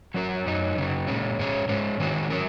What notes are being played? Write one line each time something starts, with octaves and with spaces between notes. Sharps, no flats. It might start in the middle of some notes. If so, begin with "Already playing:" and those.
F#3 C#4 F#4 A#4
F#2 F#3 D#4
F#2 C#3 F#3
A#2 G#3 C#4
G#2 G#3 C#4
G#2 G#3 C#4
D#3 G#3 C#4 F#4
F#3 C#4 A#4